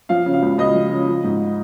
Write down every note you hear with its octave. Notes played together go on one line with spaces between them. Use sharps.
F3 F5
C#3
F5
C#2
C#2 D#5
F3
C#3
F3
G#2